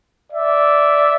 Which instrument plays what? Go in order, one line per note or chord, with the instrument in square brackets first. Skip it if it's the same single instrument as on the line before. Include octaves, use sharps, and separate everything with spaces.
[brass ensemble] D5 E5